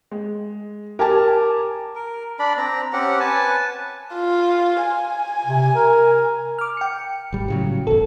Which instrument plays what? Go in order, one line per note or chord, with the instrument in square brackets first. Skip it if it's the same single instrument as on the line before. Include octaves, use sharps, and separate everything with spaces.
[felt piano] G#3
[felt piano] G4 G#5 A5 [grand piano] A#4
[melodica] A#4
D4 D5 B5
C4 A#5
C4 C#4 G4 F#5
B4 G#5 A5
[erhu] F4
G#5
[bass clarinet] C3
A#4
[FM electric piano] D6 F6
G5 C#7
[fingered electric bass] G#1 G3
A2 C#3 F#3
[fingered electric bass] F#1 E2 [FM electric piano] A4